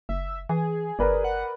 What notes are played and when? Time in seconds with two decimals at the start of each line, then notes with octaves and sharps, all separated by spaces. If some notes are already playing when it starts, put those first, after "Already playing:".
0.09 F#1 E5
0.49 E3 G#4
0.99 G1 A#4 B4 D5
1.24 F#5